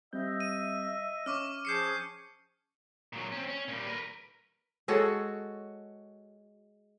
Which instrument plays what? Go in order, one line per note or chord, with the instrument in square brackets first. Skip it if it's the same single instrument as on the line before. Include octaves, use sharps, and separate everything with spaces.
[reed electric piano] G3 C4 G6 [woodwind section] D#5 E5
[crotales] D#7
[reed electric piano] C#4 [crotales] C#6 D6 F6
[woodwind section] F3 G#4 [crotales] G6 C7 C#7
[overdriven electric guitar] A#2 F#3
C4 C#4
C#4
A#2 G3
A#4 B4
[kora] G#3 F#4 A4 C#5